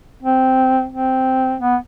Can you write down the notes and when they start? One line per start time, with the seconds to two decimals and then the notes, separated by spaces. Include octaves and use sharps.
0.23 C4
0.92 C4
1.61 B3